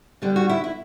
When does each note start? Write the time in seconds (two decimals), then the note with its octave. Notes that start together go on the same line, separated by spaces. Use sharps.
0.22 D3 G3 B3
0.36 F#4
0.49 E4
0.64 E4